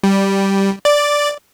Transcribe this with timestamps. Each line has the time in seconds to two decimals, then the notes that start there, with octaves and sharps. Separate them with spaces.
0.03 G3
0.85 D5